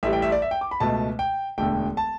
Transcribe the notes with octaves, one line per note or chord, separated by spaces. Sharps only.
A1 A2 G3 E5
G5
E5
D5
E5
G5
D6
B5
C#2 B2 A3 A5
G5
E1 D2 D3 A3 G5
A5